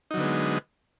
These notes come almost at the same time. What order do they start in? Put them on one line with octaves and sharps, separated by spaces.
D#4 F#3 D3 B3 G#3